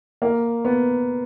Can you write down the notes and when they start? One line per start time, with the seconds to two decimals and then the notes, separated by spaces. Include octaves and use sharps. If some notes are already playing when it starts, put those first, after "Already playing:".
0.22 A#3
0.65 B3